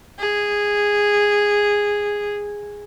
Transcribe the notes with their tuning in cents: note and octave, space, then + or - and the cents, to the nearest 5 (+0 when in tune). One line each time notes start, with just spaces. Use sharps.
G#4 -10